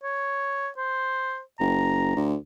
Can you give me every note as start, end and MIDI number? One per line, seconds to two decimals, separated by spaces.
0.03 0.69 73
0.78 1.41 72
1.60 2.13 30
1.60 2.28 82
2.16 2.35 38